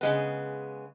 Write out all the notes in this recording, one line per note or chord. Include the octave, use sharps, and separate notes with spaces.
C#3 G#3 B3